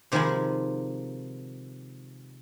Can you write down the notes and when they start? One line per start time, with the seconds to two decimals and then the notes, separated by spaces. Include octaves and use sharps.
0.12 C3 D#3 F3 G#3 G#5 B5